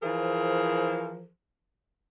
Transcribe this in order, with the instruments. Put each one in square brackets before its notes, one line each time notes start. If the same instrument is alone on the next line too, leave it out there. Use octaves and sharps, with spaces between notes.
[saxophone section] E3 F3 G#4 A#4 C5